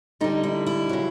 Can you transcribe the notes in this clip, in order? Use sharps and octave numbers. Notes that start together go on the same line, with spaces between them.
D3 G3 D#4
E4
E4
C#3 F#3